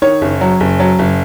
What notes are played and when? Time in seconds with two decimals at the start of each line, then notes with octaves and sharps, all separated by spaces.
0.02 D#3 C#5
0.21 F#1
0.41 F#3
0.60 F#1
0.80 F#3
0.99 F#1